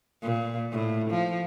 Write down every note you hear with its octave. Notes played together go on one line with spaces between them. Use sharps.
A#2
A2
F3